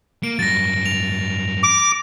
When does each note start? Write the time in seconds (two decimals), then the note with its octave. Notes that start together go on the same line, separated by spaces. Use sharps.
0.23 A#3 D7
0.39 G2 F#3 A6 A#6
0.86 F7
1.63 D6